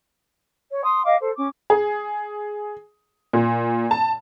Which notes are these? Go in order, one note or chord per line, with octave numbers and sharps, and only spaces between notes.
C#5
C6 D#6
D#5 F5 D6
A4 C5
C#4 D6
G#4
A#2
A5